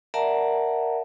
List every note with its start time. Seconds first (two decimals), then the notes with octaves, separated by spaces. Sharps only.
0.14 A#4 D5 E5 F#5 A5 A#5